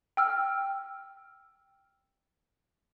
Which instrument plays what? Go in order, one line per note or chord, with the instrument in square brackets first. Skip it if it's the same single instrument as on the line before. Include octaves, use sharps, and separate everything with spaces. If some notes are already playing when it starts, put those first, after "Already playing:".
[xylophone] G5 E6 F6